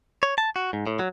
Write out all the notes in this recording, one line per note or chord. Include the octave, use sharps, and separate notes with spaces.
C#5
A5
F#4
G#2
A2
F#3